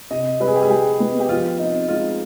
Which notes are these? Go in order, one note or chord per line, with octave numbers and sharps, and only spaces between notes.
C3 D#5
G3 B4
G#4
G4
G#4
G3 G4
B3
G4
F3 F4
C4 D#4
G#3 F4